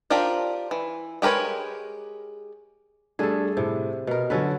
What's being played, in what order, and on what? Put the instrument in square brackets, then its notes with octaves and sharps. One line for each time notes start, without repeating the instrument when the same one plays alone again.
[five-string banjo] D4 F4 G4 A#4 C5
E3
G#3 G4 A#4 B4 C#5
[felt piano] G3 A3 D4 [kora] G#4 A4
[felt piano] A2 [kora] C3
[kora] B2 A#4 [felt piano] B3
[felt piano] D3 F#3 [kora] C#4 A4 B4